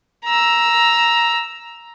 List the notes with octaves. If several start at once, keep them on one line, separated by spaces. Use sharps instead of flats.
A#5 E6